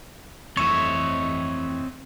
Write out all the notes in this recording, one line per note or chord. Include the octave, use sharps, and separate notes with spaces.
F2 E3 A3 C4 C#5 D#5 E5 C#6